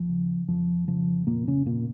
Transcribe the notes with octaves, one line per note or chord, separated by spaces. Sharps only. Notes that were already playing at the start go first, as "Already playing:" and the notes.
Already playing: D#2 F3
C#3
F2 F3
C#3 F3
F2 A#2 A#3
C#3 C#4
A#2 C#3 A#3